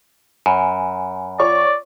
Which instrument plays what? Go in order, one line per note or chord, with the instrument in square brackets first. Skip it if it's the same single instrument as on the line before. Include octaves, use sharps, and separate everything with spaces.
[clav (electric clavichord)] F#2 [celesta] G#5 B5
[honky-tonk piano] F4 C#5 C#6 [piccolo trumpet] D5